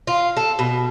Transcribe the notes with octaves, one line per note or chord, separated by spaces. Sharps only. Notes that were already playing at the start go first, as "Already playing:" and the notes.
F4
A4
B2